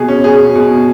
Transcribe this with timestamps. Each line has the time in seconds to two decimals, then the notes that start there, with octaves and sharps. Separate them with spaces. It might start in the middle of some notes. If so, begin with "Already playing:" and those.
Already playing: B2 G#4
0.08 C#4
0.24 G#4
0.40 B2
0.55 B2